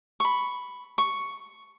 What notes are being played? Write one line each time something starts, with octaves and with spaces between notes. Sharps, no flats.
B5 C#6
C#6